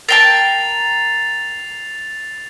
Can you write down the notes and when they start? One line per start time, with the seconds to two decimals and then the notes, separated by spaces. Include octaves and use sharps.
0.09 A#4 G5 A5 A6 C7 F7